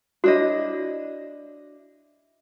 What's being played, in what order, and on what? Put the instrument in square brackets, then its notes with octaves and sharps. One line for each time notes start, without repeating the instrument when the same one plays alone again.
[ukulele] D4 E4 D#5 [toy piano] F#4 C#5